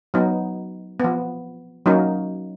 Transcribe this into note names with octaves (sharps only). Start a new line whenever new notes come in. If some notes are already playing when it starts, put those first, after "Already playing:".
F#3 B3 D#4
F3 B3
F#3 A#3 C#4 D#4